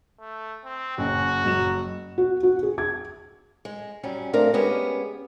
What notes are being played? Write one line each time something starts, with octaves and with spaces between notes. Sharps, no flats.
A3
C4
F#1 C#4 F#4
F#1 F#3 E7
F#4
F#4
G#4
G#6
G#3
F#2 G3 C#4
A3 C4 D4 A#4 F5
G#3 B3 C#4 G4 G#4